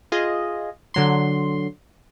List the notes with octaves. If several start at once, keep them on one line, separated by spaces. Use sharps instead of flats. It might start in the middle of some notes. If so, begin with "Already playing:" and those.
F4 G#4 D#5
D3 F#3 C6